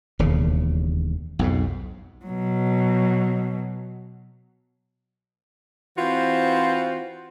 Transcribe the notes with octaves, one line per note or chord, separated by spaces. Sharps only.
E1 D#2 C#3
B1 F2 G#2
B2 F#3
E3 C4 F4 F#4 B4 C5